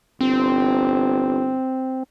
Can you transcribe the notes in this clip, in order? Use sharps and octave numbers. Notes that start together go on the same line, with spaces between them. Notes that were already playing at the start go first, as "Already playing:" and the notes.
G1 C4